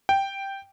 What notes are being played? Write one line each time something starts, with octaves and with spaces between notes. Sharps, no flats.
G5